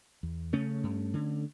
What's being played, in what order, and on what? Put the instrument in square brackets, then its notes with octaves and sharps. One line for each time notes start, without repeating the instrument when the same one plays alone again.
[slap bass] E2
C#3 A3 C#4
G2
D3